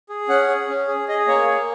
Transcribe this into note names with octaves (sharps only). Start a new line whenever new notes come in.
G#4
C#4 F#5
G#4
C#4
G#4
G#4 D#5
A#3 C#5
A#3